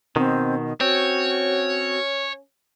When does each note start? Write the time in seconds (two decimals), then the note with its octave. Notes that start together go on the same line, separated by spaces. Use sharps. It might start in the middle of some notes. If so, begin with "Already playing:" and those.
0.16 B2 D#3 C4
0.81 C4 C#4 F#4 C#5